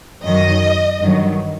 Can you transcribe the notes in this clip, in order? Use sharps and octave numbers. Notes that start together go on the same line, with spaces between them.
F#2 D#3 F#3 D#5
G2 D#3 F#3